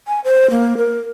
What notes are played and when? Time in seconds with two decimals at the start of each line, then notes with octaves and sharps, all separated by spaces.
0.07 G#5
0.24 C5
0.50 A#3
0.77 A#4